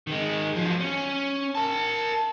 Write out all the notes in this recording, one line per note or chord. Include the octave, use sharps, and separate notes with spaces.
D#3 G#3
F3 F#3
C#4
A#4 A5